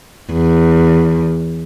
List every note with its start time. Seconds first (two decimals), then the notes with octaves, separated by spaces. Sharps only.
0.32 E2